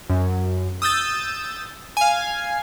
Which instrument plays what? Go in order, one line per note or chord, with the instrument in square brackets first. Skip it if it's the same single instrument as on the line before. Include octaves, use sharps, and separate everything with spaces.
[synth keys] F#2
D#6 E6 G6 A6
F5 G#5